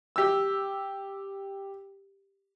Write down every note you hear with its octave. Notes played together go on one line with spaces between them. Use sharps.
G4 E6